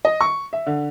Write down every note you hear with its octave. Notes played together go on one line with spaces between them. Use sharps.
D#5
C#6
E5
D3